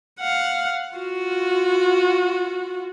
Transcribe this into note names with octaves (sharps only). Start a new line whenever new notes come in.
F5 F#5
F4 F#4